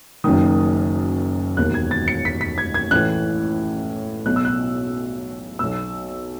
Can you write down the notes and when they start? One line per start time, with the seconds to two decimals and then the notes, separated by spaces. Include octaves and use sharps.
0.24 F#1 F#2 D#3 D#6
1.57 E1 D#2 D#3 F#6
1.74 G#6
1.91 A6
2.08 C#7
2.25 B6
2.41 B6
2.58 G#6
2.74 G#6
2.91 A1 A2 E3 F#6
4.26 B1 B2 F#6
4.36 E6
4.45 F#6
5.59 B1 B2 E6